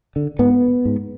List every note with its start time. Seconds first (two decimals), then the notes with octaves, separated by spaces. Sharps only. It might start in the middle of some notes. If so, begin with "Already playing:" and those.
0.16 D3
0.39 G#2 B3
0.85 G#2